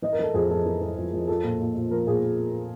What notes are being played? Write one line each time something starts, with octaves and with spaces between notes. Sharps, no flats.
E3 D#5
A#4
E3 A4
F2 G#4
F2 A4
E3
E3
F2
F2
F3 A4
A#2
A#2
A#2
F3 A#4
A#2 G#4